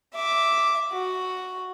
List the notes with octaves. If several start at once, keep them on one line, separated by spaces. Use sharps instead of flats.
E5 D6
F#4